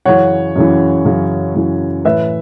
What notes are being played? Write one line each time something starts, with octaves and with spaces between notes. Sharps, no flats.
F#2 C#3 E3 C#5 F#5
F#2 C#3 E3
F#2 C#3 E3
F#2 C#3 E3
A2 E3 B4 E5